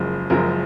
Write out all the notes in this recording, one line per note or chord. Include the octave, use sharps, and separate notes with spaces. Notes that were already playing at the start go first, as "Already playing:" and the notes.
Already playing: F#1 F#2 F3 G#3
F#1 F#2 F3 G#3 A#4